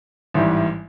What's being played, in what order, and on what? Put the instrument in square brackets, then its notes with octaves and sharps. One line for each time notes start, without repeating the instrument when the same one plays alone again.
[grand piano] A1 G#2 E3 G3